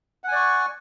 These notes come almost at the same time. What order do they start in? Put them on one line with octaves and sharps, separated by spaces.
F#5 G#5 D5 C#6